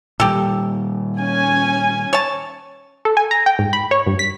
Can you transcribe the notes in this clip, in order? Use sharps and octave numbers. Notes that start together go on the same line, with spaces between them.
A#2 D#3 G3 G4 A4
C#4 G#5
C#5 A5
A4
G#5
A#5
G5
G#2
B5
C#5
G2
B6